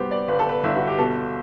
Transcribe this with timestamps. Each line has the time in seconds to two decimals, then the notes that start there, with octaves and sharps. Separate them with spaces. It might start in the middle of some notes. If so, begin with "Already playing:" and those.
Already playing: G2 B3 F#4 G4 C5
0.11 D5
0.28 G1 B4
0.39 A4
0.49 B4
0.64 G1 E4
0.76 F#4
0.87 G4
0.98 B2 A4